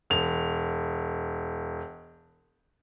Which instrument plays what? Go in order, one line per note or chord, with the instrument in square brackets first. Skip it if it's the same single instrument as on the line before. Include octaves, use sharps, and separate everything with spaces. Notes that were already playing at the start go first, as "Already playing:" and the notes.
[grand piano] E1 F7